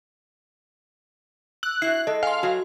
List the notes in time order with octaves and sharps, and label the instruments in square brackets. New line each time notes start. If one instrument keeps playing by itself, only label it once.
[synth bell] E6 [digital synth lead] F#6
[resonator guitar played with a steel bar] E4 F#4 [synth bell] C7
[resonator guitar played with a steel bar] G#3 A4 [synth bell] D#5
[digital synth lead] F5 [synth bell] G#5 C6
[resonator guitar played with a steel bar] F#3 [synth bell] F#4